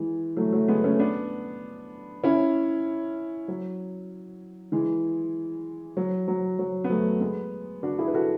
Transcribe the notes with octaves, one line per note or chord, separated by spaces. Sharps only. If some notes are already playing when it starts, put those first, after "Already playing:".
Already playing: E3 G#3
F#3 A3
F#3 A3
G#3 B3
A3 C#4
B3 D4
C#4 E4
F#3
E3 G#3
F#3
F#3
F#3
B3
F#3 A3
G#3 B3
D4 F#4
E4 G#4
B4
F#4 A4